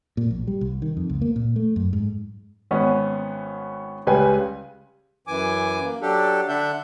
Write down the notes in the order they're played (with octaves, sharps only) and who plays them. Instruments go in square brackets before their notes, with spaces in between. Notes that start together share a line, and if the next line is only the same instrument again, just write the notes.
[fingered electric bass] A#2
A#1
G3
C2
D#3
F2
C#2
A#3
A#2
A3
F#2
G#2
[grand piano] G#1 B3 C#4
C#2 C#3 G3 B4 G5 G#5
[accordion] F#2 E3 G#5 D6
A#3
F#3 D4 G4 A4
D3 D4 E5 F#5 G6